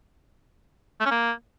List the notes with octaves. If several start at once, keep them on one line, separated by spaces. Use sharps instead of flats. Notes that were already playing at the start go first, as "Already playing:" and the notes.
A3
C#4
A#3